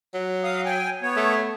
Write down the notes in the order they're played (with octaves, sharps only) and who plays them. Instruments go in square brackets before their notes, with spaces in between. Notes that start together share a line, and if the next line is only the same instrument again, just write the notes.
[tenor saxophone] F#3
[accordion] F5 D#6
G5 G#5
B3 C#5
[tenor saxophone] A3